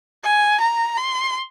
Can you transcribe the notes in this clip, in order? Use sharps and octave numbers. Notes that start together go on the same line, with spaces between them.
G#5
A#5
C6